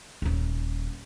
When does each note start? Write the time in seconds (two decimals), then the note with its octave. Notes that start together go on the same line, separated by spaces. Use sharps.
0.22 D#1 C#4